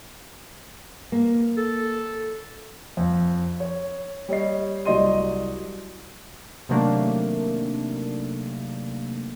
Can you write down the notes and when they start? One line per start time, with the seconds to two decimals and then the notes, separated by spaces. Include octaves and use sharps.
1.12 A#3
1.57 A4
2.97 F2
3.60 C#5
4.29 G3 C#5 D#5 C7
4.85 C2 F#3 D5 D#5 C6 D#7
6.69 C3 D#3 F#3 A3 A#3 D4